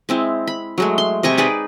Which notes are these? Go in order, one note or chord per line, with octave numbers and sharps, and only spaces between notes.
G#3 C4 E4
B5
F#3 G#3 A3
C6
C3 D#5 G#5 C#6
D#4 G#4 B4 D5